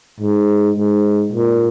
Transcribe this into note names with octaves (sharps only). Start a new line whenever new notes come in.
G#2
G#2
A#2